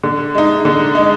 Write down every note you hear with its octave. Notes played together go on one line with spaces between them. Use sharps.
D3
G#3 D#4
D3
G#3 D#4